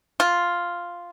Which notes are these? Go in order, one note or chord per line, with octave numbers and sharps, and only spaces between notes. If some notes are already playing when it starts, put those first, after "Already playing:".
F4